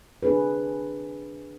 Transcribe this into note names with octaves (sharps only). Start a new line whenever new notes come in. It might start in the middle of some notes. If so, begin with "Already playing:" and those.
C4 D4 G#4 B4